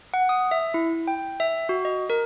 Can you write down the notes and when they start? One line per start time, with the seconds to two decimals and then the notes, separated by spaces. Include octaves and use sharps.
0.14 F#5
0.29 D#6
0.51 E5
0.74 E4
1.08 G5
1.40 E5
1.69 F#4
1.85 D#5
2.10 A#4